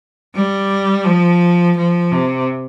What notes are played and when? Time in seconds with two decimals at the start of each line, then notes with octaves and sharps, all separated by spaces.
0.35 G3
1.05 F3
1.77 F3
2.12 C3